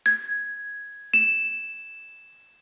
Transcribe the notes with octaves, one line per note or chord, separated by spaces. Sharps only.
G#6
E7